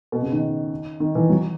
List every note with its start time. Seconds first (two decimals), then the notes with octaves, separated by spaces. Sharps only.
0.12 B2
0.22 C#3
0.32 D#3
1.00 D#3
1.15 E3
1.30 F#3